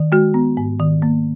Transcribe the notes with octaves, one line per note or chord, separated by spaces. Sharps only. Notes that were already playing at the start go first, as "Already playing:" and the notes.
Already playing: D#3
G#3 F#4
B3
G#2
D#3
A#3